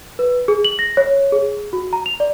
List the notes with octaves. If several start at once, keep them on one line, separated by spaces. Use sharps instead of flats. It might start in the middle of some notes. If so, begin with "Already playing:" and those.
B4
G#4
F#7
A#6
C#5
G#4
F#4
A#5
F7
D5